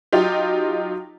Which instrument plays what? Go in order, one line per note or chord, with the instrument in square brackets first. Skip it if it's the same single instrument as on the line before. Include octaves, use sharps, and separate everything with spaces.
[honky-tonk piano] F#3 D#4 F4 G4